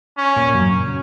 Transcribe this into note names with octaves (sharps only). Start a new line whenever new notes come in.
C#4
A#2 A#3
F#2 F#3
C#3 C#4